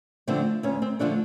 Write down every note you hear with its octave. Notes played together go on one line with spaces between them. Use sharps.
D3 F3 A3 C4
D2 C#4
C4
D3 F3 A3 D4